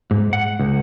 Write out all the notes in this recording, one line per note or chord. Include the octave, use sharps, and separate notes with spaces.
G#2
F#5
C#2